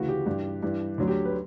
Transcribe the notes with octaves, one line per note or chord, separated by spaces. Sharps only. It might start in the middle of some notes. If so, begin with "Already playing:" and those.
Already playing: D2 C#3 E3 F#4
G4
G2 E3
G2 E3
D2 D3 F#3
G4
B4